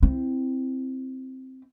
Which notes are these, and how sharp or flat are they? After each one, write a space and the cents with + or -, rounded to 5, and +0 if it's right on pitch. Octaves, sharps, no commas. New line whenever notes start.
C4 +0 E4 +10